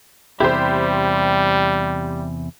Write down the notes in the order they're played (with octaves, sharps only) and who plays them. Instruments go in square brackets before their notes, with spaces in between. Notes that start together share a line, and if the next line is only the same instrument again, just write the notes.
[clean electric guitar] E2 C3 E4 [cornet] G3 [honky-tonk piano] G4 C5